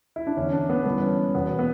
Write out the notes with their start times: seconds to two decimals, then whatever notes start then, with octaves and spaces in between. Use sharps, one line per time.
0.16 E4
0.27 D4
0.37 E2 D3 C#4
0.53 D4
0.69 B3
0.86 G2 E3 B3
1.02 C#4
1.35 E2 B2 B3
1.59 B3